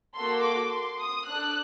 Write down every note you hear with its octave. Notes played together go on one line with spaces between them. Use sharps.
A#3 F#4 A4 C6
D6
C6
D#6
D4 A4 F#6